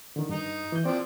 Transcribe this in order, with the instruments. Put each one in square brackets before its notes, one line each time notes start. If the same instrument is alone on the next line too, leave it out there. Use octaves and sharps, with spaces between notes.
[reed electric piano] D3 D#3
[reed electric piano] G2 [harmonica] D#4
[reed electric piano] E3 G6
[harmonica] F3 D5 [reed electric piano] C4